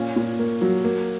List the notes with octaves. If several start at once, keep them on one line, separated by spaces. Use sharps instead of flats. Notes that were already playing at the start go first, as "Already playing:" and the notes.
Already playing: A#2 C#4
A#2
A#3
F#3
A#3